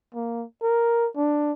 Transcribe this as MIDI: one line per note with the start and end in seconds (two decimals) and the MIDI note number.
0.14 0.45 58
0.62 1.08 70
1.16 1.52 62